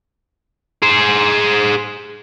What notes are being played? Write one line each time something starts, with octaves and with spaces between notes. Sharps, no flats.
G#4 C5